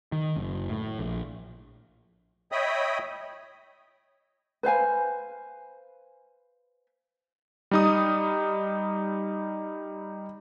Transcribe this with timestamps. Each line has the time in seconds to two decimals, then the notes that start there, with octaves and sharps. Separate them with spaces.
0.12 D#3
0.36 F#1
0.69 A2
0.99 A#1
2.52 C#5 D#5 E5 G5 B5 D#6
4.63 B4 C5 F5 G#5
7.71 G3 D#4 D#6